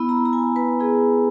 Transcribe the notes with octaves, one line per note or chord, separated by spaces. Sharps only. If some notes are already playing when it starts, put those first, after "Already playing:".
Already playing: B3 E4 B5
A#5
A#5
G#5
B4
B3 E4 G#4